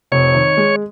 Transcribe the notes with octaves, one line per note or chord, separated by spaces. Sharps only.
F1 C#5
D#3
G#3